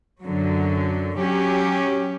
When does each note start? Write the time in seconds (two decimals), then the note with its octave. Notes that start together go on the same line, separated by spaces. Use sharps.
0.23 F#2 D3 F#3
1.16 F#3 C#4 G4